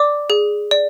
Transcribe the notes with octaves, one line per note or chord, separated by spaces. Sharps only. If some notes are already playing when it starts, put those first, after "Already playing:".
Already playing: D5 D6
G#4
D5